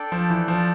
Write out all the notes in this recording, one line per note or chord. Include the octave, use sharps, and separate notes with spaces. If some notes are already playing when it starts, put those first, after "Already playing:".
Already playing: D4 A4 D5 G5
F3
E3
F3